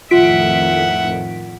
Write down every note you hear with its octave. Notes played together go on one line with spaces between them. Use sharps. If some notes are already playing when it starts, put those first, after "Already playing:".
F2 A2 D#3 F4 E5 F#5 B6 D7